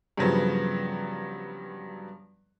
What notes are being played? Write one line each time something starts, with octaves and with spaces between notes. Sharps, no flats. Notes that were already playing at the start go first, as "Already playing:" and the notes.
G2 C#3 F3 F#3 B3